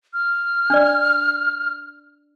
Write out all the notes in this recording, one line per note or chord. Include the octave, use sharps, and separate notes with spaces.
F6
D4 D5